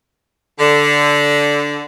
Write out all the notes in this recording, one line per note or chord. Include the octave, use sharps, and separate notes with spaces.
D3